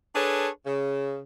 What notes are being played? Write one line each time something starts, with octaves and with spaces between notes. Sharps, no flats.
D4 G#4 A4 B4 C#5
C#3